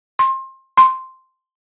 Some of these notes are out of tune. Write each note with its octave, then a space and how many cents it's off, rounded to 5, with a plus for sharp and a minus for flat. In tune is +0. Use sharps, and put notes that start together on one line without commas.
C6 +25
C6 +0